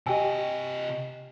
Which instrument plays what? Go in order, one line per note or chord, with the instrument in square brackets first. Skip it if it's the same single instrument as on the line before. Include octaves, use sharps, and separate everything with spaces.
[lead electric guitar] C3 D#5 [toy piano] G4 G5 G#5